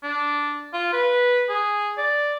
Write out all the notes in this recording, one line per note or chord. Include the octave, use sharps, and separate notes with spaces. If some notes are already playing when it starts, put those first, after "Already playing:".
D4
F4
B4
G#4
D5